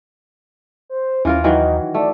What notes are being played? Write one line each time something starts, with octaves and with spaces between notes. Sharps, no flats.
C5
D#2 E3 C#4 F4 A#4
D#3 E3 F#3 D#4
A3 D5